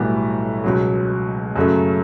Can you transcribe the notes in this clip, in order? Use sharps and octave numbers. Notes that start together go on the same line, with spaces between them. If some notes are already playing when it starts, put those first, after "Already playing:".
Already playing: B1 A2 E3 G3 B3
C#2 B2 F#3
F#2 C#3 F#3 A3